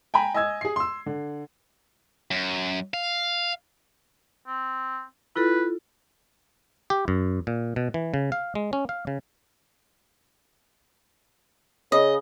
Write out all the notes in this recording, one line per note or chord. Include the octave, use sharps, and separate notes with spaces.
G5 G#5 A#5 B5
D#5 G#5 E6 G#6
G#4 C7
C6 E6
D3
F#2
F5
C4
E4 F4 A4 B4
G4
F#2
A#2
B2
E3
C#3
F5
G#3
C#4
F5
C#3
C#3 D#5